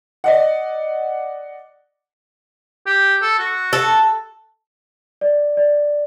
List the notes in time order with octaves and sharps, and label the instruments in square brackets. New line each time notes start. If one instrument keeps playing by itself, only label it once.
[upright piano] D5 D#5 F#5
[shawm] G4
A4
F#4
[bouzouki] A4
[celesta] D5
D5